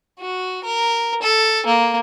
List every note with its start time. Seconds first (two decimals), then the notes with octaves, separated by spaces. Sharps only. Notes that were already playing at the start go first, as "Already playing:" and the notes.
0.20 F#4
0.64 A#4
1.22 A4
1.66 A#3